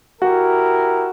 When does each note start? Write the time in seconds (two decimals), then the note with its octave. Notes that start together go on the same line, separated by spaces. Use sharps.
0.22 E4 F#4 G4 A#4